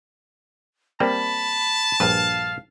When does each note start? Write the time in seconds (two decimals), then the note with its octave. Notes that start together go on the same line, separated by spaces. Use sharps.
1.00 G3 A#3 C4 A5 B5
2.00 A#1 G2 B4 F5